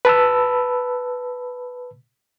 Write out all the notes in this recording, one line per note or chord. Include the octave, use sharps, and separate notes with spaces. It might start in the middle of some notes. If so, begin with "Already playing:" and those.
B4 A5 B5 E6